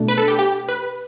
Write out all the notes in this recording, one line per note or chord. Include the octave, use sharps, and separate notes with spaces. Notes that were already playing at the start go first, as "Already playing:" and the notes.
Already playing: B2 A3 D4
B4
A4
G4
G4
B4